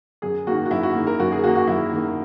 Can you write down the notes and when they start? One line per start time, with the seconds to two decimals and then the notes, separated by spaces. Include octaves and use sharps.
0.22 F#2 G#4
0.47 D#3 A#3 F#4
0.66 F#4
0.71 F#2 E4
0.83 F#4
0.95 D#3 A#3
1.07 A#4
1.20 F#2 F#4
1.32 G#4
1.44 D#3 A#3 F#4
1.55 F#4
1.67 F#2 E4
1.92 D#3 A#3